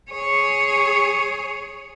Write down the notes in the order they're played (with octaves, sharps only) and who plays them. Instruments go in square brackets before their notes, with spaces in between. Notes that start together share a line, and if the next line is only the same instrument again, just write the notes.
[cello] G#4 C#5